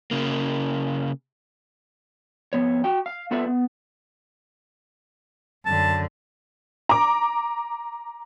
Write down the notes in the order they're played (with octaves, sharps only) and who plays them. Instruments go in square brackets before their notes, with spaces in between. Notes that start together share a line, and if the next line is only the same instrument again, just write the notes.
[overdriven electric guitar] C#3 A#3
[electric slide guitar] F2 B2 B3 C#5
F#4 G5
F5
B3 F4 A4 B4 D5 E5
B3
[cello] F#2 D3 [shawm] A5
[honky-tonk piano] A#5 D6